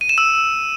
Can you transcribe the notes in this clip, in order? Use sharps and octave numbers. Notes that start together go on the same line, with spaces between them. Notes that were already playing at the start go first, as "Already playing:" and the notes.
D#7
E7
E6